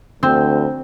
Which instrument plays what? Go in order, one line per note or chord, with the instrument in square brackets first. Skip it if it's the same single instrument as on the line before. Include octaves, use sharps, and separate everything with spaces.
[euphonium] D2 [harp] C4